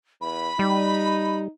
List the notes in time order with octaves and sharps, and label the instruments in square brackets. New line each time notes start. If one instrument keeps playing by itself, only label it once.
[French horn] E2 [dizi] B5
[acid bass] G3 [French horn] D#4